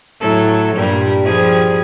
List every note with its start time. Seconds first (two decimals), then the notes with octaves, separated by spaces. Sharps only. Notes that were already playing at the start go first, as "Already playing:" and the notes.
0.20 A2 F#3 A4
0.76 G2 A#2 G3
1.23 F3 G3 G#4